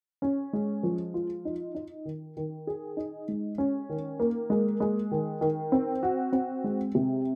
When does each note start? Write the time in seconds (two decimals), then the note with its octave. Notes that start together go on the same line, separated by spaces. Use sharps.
0.22 C#4
0.53 G#3
0.83 F3
1.14 F4
1.45 D#4
1.75 D#4
2.05 D#3
2.37 D#3
2.67 G#4
2.97 D#4
3.28 G#3
3.58 C#4
3.89 D#3
4.20 A#3
4.50 G#3
4.80 G#3
5.12 D#3
5.41 D#3
5.72 C4
6.03 F#4
6.32 C4
6.64 G#3
6.95 C3